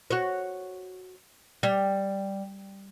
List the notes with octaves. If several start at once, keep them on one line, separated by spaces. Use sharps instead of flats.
F#4 C#5
G3